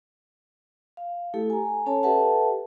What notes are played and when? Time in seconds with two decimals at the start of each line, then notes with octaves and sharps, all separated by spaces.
0.97 F5
1.34 A3 E4 G4 A4
1.50 G#5 A#5
1.86 C#4 A4 C#5 A5
2.03 G4 A4 B4 E5 F#5 A5